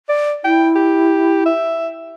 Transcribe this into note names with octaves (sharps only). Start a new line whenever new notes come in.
D5
E4 G5
G4
E5